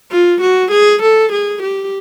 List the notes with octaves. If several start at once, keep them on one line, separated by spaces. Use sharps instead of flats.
F4
F#4
G#4
A4
G#4
G4